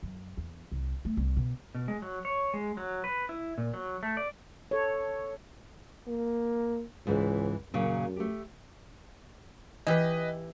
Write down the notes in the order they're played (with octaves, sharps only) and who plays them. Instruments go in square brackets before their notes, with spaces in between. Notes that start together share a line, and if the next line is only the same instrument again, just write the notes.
[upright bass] F#2
E2
C2
A3
C2
B2
[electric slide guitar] B2
G#3
F#3
C#5
G#3
F#3
B4
E4
A#2
F#3
A3
D5
[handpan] A4 C#5
[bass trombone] A#3
[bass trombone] C#2 [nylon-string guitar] G#2 E3
[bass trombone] F#2 [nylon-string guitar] A#2 C#3 F#3
[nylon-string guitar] A3 G4
[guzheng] E3 G4 [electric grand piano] B4 D#5